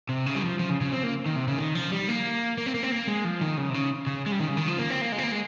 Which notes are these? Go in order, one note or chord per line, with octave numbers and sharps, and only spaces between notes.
C3
C#3
G3
F3
F3
C#3
C#3
C4
A#3
D#3
C3
C#3
D#3
F3
G3
A#3
A#3
C4
A#3
C4
A#3
G#3
F3
D#3
C#3
C3
C#3
C#3
G#3
G3
D#3
C#3
D#3
F3
A#3
C4
A#3
G#3
C4
A#3
G#3